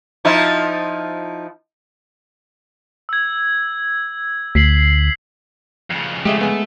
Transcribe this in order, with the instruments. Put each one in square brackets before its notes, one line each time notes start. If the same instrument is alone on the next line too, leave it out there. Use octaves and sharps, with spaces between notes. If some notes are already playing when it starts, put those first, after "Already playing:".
[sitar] F3 D#4 E4
[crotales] E6 G#6
[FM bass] D2 [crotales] B6 C7 F#7
[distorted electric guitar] F2 C#3
[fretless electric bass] G#3 [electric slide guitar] A3 [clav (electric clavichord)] G4 D#5 E5
[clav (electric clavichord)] B3 G#4